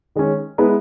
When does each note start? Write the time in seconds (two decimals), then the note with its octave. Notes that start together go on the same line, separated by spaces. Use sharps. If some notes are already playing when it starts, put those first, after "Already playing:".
0.16 D#3 G#3 C#4
0.58 G#3 B3 E4 B4